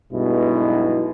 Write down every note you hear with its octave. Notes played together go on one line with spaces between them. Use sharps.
B1 G2 B2 G#3 E4